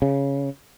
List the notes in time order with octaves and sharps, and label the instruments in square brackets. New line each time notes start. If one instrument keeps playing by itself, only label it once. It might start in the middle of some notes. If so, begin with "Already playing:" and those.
[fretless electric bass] C#3